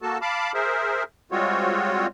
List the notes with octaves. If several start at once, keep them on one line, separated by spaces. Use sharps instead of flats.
A#3 F#4 A4 A5
F5 A5 B5 D6
G#4 A#4 C5 E5
G3 G#3 C4 F4 F#4 C#5